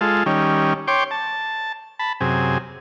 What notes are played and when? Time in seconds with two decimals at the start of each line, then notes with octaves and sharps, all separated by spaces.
0.01 G#3 F4 A4
0.26 D#3 G3 C#4
0.88 C#5 G5 C6 D6
1.11 A5
1.99 A5 B5
2.21 F#2 C3 G#4